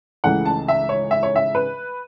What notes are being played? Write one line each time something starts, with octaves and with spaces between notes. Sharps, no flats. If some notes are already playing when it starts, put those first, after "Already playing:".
C#2 C#3 E3 A3 F#5
A5
E5
C#5
E5
C#5
E5
B4